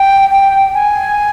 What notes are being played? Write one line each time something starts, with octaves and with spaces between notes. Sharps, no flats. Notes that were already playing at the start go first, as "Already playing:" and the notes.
Already playing: G5
G5
G#5